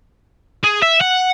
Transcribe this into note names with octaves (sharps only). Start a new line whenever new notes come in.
G#4
E5
F#5